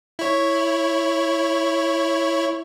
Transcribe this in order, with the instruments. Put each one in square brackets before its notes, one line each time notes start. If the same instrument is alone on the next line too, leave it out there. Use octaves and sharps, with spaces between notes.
[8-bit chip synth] E4 C#5